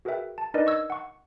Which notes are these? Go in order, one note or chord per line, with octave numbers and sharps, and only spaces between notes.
F#4 G#4 A#4 B4 E5 G5
A5
D4 D#4 A#4 B4 D5 D#5
D#5 C#6 E6 G#6
F#5 C#6